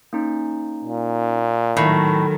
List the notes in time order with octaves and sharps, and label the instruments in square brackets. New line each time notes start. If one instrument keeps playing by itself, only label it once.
[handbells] A#3 C#4 D#4
[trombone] A#2
[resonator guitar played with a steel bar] A2 [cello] D#3 F#3 [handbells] A#4 B5 C#6